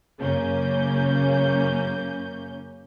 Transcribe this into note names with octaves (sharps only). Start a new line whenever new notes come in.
F#2 C#3 A#3 C#4 G6